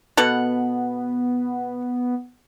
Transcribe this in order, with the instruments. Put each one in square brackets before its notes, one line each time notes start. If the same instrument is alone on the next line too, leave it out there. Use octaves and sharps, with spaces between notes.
[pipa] B2 A4 F#5 [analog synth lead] B3